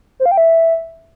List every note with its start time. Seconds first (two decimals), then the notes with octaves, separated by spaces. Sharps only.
0.20 C5
0.26 F5
0.31 G5
0.37 E5